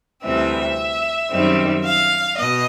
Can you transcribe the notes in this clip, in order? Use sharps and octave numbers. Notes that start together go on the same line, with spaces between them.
D2 C3 E3 G3 C4 E5
F#2 D#3 G3 C4
F5
B2 D#5